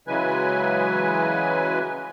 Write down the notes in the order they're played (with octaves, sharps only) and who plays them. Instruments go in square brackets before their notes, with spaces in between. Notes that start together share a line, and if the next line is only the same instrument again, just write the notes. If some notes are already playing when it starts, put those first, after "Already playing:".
[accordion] C#3 E3 F#3 G#3 B4 G#5